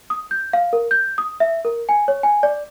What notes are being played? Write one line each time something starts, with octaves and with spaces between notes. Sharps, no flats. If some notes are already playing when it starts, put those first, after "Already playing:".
D#6
G6
F5
A#4
G6
D#6
E5
A#4
G#5
C#5
G#5
D5